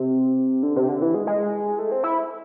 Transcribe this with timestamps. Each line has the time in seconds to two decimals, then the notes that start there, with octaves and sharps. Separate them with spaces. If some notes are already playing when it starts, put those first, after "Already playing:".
Already playing: C3
0.63 D3
0.76 C3
0.89 D3
1.02 E3
1.14 G#3
1.27 G#3
1.79 A3
1.92 C4
2.04 E4